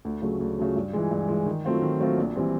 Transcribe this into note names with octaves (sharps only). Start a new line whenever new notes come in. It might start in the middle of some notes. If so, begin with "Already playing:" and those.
D2
C#3 F#3 A3
D2
C#3 F#3 A3
G2
E3 G#3
G2
E3 G#3
D#3
F#3 A3 C4 F4
D#3
F#3 A3 C4 F4
A#1
E3 G3 C4